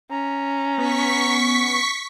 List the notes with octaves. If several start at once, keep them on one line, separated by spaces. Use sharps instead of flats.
C#4 A#5
B3 C#6 B6